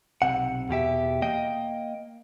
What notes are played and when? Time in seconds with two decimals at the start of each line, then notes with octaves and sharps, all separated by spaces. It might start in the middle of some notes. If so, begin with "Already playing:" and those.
0.22 B1 C3 F#5
0.69 E2 B2 G4 E5
1.22 A#3 D#5 G5